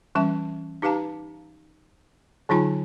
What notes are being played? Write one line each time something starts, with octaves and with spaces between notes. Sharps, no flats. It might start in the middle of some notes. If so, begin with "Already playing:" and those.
E3 G3 C#4 E5 A5
D#4 G4 B4 F5 A5 A#5
D3 F#3 D#4 F4 G#5 C#6